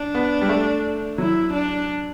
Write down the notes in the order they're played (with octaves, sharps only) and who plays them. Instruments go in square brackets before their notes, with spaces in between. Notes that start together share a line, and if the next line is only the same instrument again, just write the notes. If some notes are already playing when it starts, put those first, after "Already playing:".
Already playing: [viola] D4
[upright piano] B3
G3
A3
[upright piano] F#3 [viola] E4
[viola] D4